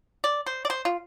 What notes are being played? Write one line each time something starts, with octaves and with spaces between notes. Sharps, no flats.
D5
C5
D5
C5
F4